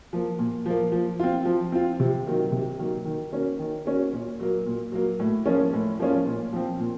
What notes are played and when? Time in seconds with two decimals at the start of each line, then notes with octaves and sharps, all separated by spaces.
0.13 F3 A#3
0.39 A#2
0.66 F3 A#3
0.92 F3
1.20 C4 F4
1.45 F3
1.72 C4 F4
2.00 C3
2.26 D#3 F#3 A#3
2.52 C3
2.79 D#3 F#3 A#3
3.05 D#3
3.33 A#3 C#4 F#4
3.59 D#3
3.85 A#3 C#4 F#4
4.13 A#2
4.40 F#3 A#3
4.66 A#2
4.92 F#3 A#3
5.19 A2
5.46 F3 A#3 C#4 F4
5.73 A2
5.99 F3 A#3 C#4 F4
6.26 A#2
6.53 F3 C4
6.79 A#2